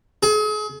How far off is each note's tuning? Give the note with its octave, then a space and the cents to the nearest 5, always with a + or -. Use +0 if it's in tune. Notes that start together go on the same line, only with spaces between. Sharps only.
G#4 +40